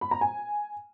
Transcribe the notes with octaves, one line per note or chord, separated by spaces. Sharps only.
B5
A#5
G#5